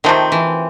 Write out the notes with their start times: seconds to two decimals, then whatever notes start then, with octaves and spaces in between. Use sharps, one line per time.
0.04 C3 D#3 F3 A3 C4
0.32 E3